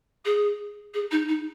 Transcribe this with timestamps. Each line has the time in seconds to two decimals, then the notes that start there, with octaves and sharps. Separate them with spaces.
0.24 G#4
0.93 G#4
1.11 D#4
1.28 D#4